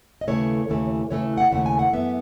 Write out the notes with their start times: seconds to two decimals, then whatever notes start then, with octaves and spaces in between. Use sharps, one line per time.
0.21 D#5
0.28 D#2 C#3 E3 A3 C#5
0.68 D#2 C#3 E3 A3
1.10 D#2 C#3 E3 A3 C#5
1.38 F#5
1.52 D#2 C#3 E3 A3 F#5
1.66 G#5
1.79 F#5
1.93 F#2 E3 B3 E5